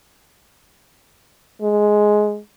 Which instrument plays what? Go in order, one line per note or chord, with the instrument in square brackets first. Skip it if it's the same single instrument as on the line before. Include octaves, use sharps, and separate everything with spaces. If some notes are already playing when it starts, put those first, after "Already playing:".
[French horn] G#3